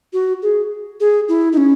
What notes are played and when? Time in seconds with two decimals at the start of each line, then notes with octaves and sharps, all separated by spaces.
0.13 F#4
0.42 G#4
1.00 G#4
1.29 E4
1.52 D#4
1.57 C#4